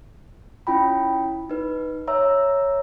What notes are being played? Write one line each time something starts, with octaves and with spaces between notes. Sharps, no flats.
C#4 E4 F4 G5 B5
D#4 B4
C#5 E5 A#5 E6